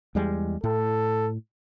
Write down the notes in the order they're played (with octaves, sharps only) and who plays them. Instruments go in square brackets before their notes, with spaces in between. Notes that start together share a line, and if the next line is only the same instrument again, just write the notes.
[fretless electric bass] E2 G3 G#3
[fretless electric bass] A2 [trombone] A4